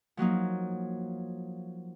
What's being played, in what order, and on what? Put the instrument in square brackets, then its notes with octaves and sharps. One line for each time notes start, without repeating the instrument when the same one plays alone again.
[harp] F3 F#3 A#3 D#4